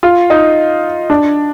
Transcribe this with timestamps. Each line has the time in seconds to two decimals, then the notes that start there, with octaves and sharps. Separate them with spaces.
0.03 F4
0.30 D#4
1.10 D4